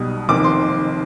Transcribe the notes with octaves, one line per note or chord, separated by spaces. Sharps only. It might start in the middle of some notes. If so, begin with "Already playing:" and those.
Already playing: B1 B2 G3 D#6
F1 F2 D#3 D6
C6